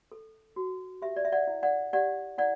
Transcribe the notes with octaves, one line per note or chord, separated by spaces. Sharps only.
A4
F#4
G4 E5
D5
E5
D5 F#5
E4
D5 F#5
G4 D5 F#5
E4 D5 F#5